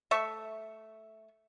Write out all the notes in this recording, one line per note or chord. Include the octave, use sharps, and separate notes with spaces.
A3 E5 C#6